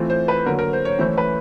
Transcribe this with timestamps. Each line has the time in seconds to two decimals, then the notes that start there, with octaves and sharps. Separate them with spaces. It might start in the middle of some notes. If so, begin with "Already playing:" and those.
Already playing: E3 A3 C4 F4
0.10 C5
0.28 B4
0.46 D3 F#3 A#3 A#4
0.59 A#4
0.73 C5
0.85 C#5
0.99 E3 A3 C#4 E4 C5
1.18 B4